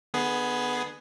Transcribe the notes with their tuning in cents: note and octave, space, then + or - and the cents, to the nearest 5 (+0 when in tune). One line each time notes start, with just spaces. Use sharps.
D3 +40 B3 +0 G#4 +10